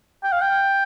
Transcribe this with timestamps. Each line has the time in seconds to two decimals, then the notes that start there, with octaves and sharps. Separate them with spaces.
0.23 G5
0.32 F5
0.41 G5